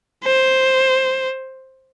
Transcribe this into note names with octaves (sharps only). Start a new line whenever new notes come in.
C5